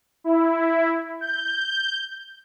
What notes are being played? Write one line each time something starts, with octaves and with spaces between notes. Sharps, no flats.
E4
G6